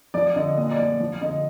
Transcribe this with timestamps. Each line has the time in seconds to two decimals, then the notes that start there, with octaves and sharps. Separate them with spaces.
0.14 F3 D5
0.35 D3 D#5
0.58 A#2 D#5
0.71 D5
0.79 F3
1.00 F3
1.21 D3 D#5